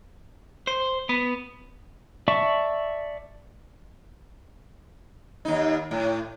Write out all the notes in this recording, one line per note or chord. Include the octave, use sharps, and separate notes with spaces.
C5
B3
D5 E5 A5 C#6
D#2 D#4
A2